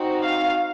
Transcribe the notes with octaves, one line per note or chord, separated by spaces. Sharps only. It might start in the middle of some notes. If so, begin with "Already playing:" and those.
Already playing: C4 D#4 F#4
F5